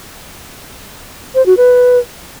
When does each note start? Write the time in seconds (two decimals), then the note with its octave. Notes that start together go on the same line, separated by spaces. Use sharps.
1.35 C5
1.46 F#4
1.57 B4